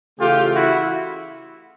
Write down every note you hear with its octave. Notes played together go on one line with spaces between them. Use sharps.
C#3 E3 A3 F4 G4
E4 F#4